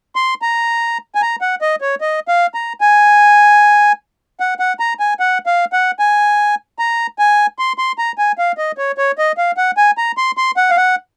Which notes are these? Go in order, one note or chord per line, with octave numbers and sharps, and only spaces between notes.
C6
A#5
G#5
A#5
F#5
D#5
C#5
D#5
F5
A#5
G#5
F#5
F#5
A#5
G#5
F#5
F5
F#5
G#5
A#5
G#5
C6
C6
A#5
G#5
F5
D#5
C#5
C#5
D#5
F5
F#5
G#5
A#5
C6
C6
F#5
F5
F#5